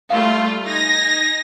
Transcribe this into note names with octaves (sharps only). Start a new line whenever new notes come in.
G3 A3 F4 F5
D#4 G#5 A#6